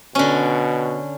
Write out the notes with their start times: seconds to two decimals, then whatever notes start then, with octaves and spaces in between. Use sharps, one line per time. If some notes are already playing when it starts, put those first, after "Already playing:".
0.15 B2 D3 C#4